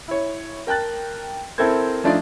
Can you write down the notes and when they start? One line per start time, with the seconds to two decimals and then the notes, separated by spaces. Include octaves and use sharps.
0.08 E4 C#5
0.67 A#4 G5 A5 F#6 A6
1.58 C4 E4 A4 A#4 C5 G#6
2.04 F3 A3 D4 D#4 F4 D5